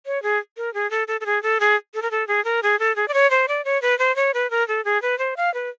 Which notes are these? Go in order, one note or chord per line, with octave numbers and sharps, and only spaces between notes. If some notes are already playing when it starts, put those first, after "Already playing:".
C#5
G#4
A#4
G#4
A4
A4
A4
G#4
A4
G#4
A4
A#4
A4
G#4
A#4
G#4
A4
G#4
D5
C#5
C5
D5
C#5
B4
C5
C#5
B4
A#4
A4
G#4
B4
C5
F5
B4